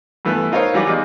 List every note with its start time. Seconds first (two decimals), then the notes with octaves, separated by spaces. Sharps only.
0.25 G2 E3 A3 B3
0.52 D#4 F4 A#4 C5 C#5 F5
0.74 E3 F#3 G3 F4 G4 D5
0.87 E2 D#4 D5